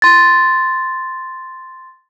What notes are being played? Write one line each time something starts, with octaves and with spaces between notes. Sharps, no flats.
C6 A6